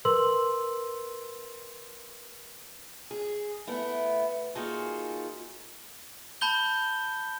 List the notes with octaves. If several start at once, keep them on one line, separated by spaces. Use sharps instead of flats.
A#4 B4 C6 E6 F#7
G#4
A3 B3 E4
A#3 D#4 F4 F#4 G#4 A4
A5 B5 G6 G7